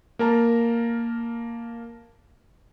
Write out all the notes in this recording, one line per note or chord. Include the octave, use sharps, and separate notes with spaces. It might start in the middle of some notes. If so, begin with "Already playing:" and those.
A#3 A#4 A5 A#5